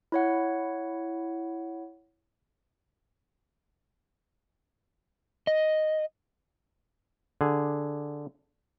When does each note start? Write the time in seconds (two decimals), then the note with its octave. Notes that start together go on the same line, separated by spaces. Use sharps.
0.12 E4 C#5 F#5
5.47 D#5
7.41 D3 G#4